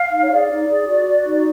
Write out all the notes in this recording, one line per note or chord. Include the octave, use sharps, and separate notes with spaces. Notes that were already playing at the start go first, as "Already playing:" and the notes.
Already playing: F5
D#4
C#5
G#4 D5
D#4
G#4
F#4
F#4
D#4